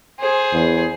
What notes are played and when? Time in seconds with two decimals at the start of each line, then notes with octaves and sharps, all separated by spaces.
0.20 G#4 C5
0.53 E2